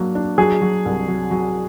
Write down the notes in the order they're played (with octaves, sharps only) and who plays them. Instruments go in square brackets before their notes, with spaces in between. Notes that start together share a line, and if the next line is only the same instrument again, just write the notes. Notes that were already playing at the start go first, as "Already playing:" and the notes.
Already playing: [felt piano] F#3 A#3 D4
D4
[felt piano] F#3 [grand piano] G#4
[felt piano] F#3
C2
F#3
F#3